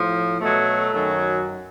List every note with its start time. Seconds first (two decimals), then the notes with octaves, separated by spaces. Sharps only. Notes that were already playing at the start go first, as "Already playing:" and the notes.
Already playing: A2 F3
0.41 B2 F#3 A3
0.92 F#2 D#3 F#3